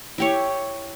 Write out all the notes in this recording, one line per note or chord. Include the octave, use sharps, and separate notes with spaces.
E4 G4 C#5